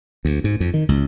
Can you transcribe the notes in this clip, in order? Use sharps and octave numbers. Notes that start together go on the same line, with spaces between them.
D2
G#2
F2
D#3
C#2